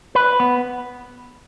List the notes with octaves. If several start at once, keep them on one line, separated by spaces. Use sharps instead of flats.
B4
B3